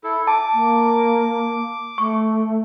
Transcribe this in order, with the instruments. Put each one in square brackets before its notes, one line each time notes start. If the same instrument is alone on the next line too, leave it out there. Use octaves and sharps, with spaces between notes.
[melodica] E4 A4
[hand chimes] A5 [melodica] D6
[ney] A#3
[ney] A3 [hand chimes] C#6